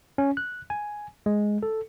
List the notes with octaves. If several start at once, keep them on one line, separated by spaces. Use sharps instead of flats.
C#4
F#6
G#5
G#3
A4